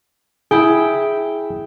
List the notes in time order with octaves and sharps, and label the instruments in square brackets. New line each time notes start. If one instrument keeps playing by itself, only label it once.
[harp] E4 G5 [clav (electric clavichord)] G#4